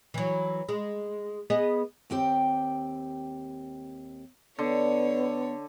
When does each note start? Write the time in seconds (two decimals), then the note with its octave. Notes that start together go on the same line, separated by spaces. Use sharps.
0.14 E3 F#3
0.69 G#3
1.50 B3 G#4 D#5
2.10 D#2 C4 G4 G5
4.59 D3 B3 C#5